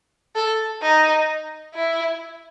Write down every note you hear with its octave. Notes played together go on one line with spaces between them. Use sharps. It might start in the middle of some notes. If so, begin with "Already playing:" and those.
A4
D#4
E4